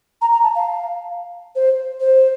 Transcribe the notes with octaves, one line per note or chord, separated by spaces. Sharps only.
A#5
A#5
A5
F5
C5
C5